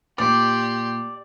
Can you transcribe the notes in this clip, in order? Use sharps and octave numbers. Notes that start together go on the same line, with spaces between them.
A#2 G4 D5 C6 D6